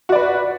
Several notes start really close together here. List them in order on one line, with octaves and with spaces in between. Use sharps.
F#4 D5 B4